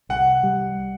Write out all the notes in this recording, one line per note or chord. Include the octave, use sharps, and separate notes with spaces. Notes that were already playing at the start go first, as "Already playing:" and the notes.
C2 F#5
G3